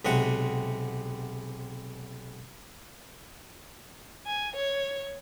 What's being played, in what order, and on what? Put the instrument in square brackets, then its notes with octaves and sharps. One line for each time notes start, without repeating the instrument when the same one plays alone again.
[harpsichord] B1 C3 G#3 F#5
[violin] G#5
C#5